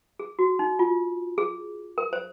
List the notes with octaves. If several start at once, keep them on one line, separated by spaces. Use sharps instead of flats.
G#4
F#4
D#4
F4
G#4
A#4
C5